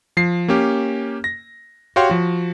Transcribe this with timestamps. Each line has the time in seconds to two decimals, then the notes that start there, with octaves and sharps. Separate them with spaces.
0.17 F3 C7
0.48 A#3 C#4 G4
1.24 A#6
1.96 F#4 G4 C#5 F5 G5 C6
2.10 F3 F#4